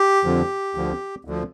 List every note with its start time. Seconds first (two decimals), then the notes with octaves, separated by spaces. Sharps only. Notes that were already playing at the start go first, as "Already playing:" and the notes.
Already playing: G4
0.24 F2 D3 F3
0.75 D2 D3 F3
1.25 D2 D3 F3